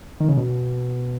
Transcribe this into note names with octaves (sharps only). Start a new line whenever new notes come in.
D#3
C#3
B2